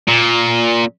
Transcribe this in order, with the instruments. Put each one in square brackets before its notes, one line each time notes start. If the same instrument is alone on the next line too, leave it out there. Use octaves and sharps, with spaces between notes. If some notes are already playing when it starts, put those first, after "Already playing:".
[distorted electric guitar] A#2